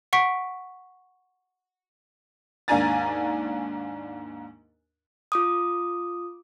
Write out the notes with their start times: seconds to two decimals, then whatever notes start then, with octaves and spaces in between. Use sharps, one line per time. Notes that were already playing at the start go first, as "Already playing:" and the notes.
0.13 F#5 C#6 B6 D7
2.68 D#2 G#2 D4 G#5 A#5 A6
5.32 F4 D6 D#6